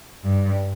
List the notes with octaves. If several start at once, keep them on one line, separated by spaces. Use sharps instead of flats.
G2